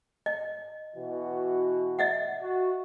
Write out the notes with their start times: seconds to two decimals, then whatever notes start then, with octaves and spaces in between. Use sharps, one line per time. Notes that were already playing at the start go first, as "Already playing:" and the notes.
0.26 D#5
0.95 B2 E3 F#4
1.99 D#5 E5 F#5
2.41 F#4